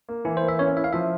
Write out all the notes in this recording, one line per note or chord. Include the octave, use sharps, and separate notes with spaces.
A#3
E3 E4
A#3 C5
E5
C#4 C#5
E4 E5
F5
F3 E5